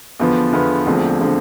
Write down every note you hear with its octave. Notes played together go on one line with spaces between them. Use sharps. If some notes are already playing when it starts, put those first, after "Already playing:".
E2 D3 F3 B3
E2 D3 F3 B3
E1 D2 D3 F3 C4
D3 F3 C4